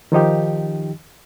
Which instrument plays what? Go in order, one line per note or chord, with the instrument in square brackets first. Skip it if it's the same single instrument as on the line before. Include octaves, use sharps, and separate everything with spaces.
[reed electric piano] D#3 F3 D#4 G4